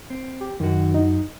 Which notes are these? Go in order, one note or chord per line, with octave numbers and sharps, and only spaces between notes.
C4
G4
F#2 D#3 F#4
D#4